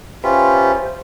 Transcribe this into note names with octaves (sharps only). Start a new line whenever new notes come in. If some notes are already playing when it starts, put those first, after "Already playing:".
C#4 F4 G4 B4 C5 E5